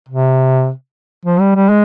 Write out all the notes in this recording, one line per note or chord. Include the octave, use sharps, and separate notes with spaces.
C3
F3
G3
G3
G#3